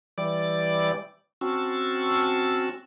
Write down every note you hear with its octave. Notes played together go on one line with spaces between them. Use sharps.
E3 G3 D5 D6
C4 C#4 F#4 A5 E6